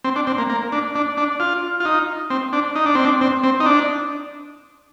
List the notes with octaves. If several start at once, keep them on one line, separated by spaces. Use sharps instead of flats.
C4
D4
C4
A#3
A#3
D4
D4
D4
F4
F4
D#4
C4
D4
D#4
D4
C4
D4
C4
C4
D#4
D4